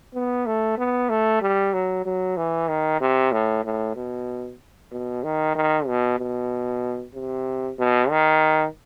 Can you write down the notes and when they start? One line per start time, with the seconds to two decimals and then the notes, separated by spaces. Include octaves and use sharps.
0.14 B3
0.46 A3
0.78 B3
1.10 A3
1.41 G3
1.73 F#3
2.05 F#3
2.37 E3
2.69 D#3
3.01 C3
3.32 A2
3.65 A2
3.96 B2
4.92 B2
5.24 D#3
5.55 D#3
5.87 B2
6.19 B2
7.15 C3
7.79 B2
8.10 D#3